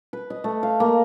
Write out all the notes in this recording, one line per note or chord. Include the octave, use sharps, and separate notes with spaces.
B4
D#5
A3
F5
A#3